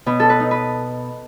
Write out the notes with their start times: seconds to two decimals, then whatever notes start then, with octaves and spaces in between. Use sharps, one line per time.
0.06 B2 B4
0.20 A4
0.30 B4
0.40 D#4
0.51 B4